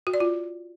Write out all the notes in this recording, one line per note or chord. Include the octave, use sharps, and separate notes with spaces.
F#4
D5
F4